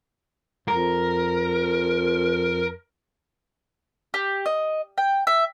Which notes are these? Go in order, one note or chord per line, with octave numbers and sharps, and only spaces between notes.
F2 A#4
G4
D#5
G5
E5